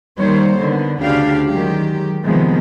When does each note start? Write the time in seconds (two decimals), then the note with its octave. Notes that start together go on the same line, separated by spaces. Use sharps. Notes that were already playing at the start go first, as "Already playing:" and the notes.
0.18 D#3 G3 A#3 C5 C#5
0.58 D3 D#3 B3
1.02 D2 C#3 D4 G4 F5
1.48 D#3 F#3 G#3 G4
2.24 C3 D#3 F3 G#3 A#3 B3